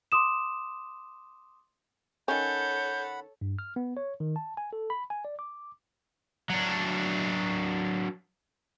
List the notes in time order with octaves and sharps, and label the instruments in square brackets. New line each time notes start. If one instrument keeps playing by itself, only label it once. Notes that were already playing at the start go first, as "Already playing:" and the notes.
[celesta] C6 D6 D#6 E7
[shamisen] D#3 C#4 [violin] A4 C#5 [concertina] F#5 B5 [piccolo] G6
[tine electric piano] G2
F6
B3
C#5
D#3
A5
G#5
A4
B5
G#5
D5
D6
[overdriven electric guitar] F#3 D4